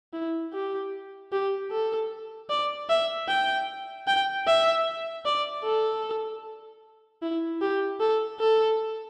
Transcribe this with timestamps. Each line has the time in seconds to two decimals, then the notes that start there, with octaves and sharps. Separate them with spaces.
0.13 E4
0.54 G4
1.32 G4
1.71 A4
2.50 D5
2.89 E5
3.28 G5
4.07 G5
4.47 E5
5.25 D5
5.64 A4
7.22 E4
7.61 G4
8.00 A4
8.40 A4